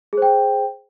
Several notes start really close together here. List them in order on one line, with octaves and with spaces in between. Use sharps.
G#4 C5 G5